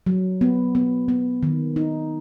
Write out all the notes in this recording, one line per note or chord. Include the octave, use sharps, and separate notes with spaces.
F#3
B3
B3
B3
D#3
D#4